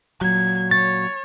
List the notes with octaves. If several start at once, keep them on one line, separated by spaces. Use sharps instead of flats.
A#2 F#3 G#6
C#5 A6